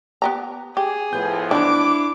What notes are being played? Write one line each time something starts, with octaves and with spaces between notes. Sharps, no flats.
B3 G4 A#5
G4 G#4
A2 F3 B3 G6
D#3 E3 D4 E4 D6